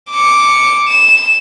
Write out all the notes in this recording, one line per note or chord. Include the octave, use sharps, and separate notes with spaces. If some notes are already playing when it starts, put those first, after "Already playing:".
D6 C#7
E7